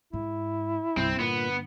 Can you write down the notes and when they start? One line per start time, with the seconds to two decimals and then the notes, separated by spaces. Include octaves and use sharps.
0.13 G#2 E4
0.97 C2 G2 D3 C4
1.20 A#2 B3